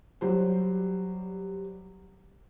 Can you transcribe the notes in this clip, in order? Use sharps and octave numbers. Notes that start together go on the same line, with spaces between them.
F#3 G3 C5